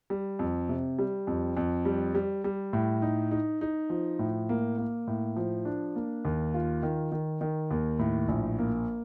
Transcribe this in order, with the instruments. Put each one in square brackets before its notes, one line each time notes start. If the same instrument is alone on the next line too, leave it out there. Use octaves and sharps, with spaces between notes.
[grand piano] G3
F2
C3
G3
F2
F2
G3
G3
G3
A2
D#4
D#4
D#4
F3
A2
A#3
A#3
A2
F3
D4
A#3
D#2
F4
D#3
D#3
D#3
D#2
A2
A#1
A#3